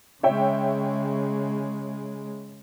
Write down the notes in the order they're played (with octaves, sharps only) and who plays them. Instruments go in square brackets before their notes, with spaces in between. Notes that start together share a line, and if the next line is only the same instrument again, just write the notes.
[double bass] C#3 G#3 [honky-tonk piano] C#5 E5 G5